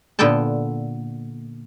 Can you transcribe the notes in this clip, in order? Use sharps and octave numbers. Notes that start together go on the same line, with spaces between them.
A#2 D3 B3 A4 G5 A5